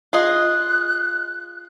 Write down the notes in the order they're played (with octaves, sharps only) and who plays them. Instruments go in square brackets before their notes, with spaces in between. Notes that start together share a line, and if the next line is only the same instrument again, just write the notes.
[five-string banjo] F4 G#4 D#5 [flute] F#6